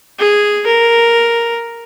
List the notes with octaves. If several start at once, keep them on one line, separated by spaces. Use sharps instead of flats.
G#4
A#4